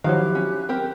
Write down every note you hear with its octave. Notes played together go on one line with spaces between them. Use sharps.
D#3 F3 F#3 E4 G4 F5 F#6
C#4
C4 G4 A#4